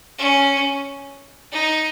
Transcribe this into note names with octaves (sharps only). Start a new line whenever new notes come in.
C#4
D#4